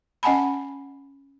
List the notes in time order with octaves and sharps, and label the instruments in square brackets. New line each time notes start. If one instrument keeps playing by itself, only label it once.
[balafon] C#4 D#5 F#5 G#5 A5 B5